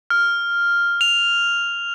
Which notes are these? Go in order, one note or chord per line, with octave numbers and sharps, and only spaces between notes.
F6
F7